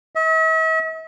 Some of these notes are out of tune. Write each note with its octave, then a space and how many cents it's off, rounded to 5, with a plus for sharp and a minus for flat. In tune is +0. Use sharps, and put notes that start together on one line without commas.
E5 -45